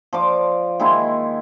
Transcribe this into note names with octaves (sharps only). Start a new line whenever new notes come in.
F3 D5 D6
D#3 G#3 A#3 E4